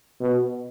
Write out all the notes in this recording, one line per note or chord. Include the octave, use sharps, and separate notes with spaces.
B2